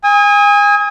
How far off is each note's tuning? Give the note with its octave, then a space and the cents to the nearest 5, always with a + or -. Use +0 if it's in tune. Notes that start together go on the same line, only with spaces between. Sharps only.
G#5 -30 D#6 +30